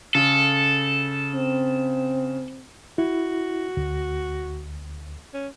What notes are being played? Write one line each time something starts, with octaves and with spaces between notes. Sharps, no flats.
C#3 A4
C4
E4 F#4
D2
C#4